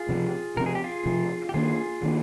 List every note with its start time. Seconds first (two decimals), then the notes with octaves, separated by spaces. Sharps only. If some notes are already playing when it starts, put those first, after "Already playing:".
Already playing: F4 G#4
0.09 C3 F3 C4
0.57 C3 F3 C4 A#4
0.66 G#4
0.75 G4
0.84 F4 G#4
1.06 C3 F3 C4
1.49 G4
1.54 D#3 A#3 D4 F4 G#4
2.03 D#3 A#3 D4